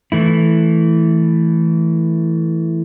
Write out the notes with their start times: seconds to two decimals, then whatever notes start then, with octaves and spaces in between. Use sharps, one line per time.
0.12 E3 A3 E4